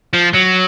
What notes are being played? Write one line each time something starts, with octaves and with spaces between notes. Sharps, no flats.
F3
F#3